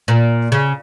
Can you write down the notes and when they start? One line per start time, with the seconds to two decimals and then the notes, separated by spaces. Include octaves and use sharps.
0.08 A#2
0.52 C#3